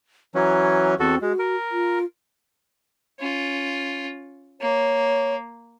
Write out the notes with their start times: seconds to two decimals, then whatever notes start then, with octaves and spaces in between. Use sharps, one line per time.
0.35 E3 F#3 C#4 A#5
1.00 E2 C4 F#4 A4
1.22 G#3 F#4
1.39 A#4
1.71 F4
3.19 C#4 F4
4.61 A#3 C#5